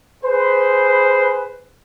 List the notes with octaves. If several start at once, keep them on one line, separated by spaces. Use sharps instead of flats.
G#4 B4 C5